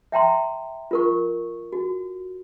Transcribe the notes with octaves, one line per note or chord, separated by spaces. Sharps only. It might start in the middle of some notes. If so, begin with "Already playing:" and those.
E5 G5 A#5 C6
F4 A#4 C#6
F#4